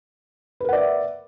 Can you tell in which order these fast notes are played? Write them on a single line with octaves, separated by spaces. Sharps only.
B4 A#4 F#5 D5 E5